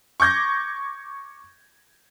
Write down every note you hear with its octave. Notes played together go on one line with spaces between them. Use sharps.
C#6 D6 G6 G#6 A#6